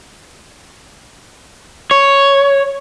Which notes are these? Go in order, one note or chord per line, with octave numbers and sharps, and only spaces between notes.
C#5